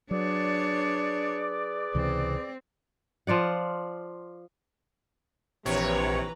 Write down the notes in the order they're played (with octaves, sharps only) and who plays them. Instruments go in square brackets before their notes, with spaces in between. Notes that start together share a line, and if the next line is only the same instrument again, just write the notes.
[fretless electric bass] F#3 [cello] D4 C#5 [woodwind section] G#4 B4 D5
[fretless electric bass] C#2 C3 E3 [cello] C4
[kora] F3 F4 D5 F#5
[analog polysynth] A#1 C#5 [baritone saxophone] C3 [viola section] E3 B4 A#5